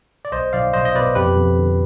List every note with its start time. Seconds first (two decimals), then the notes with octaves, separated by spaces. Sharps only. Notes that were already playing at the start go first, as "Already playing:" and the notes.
0.25 D5
0.32 B1 C5 D#5
0.53 B1 D5 F5
0.73 B1 C5 D#5
0.85 D#5
0.95 B2 B4 D5
1.15 F2 G4 B4
1.37 F2
1.58 D3